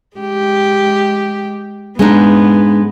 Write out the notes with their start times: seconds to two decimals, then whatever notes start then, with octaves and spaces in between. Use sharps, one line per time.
0.17 G#3 G4
1.99 G#2 G#3 B3 D4 D#4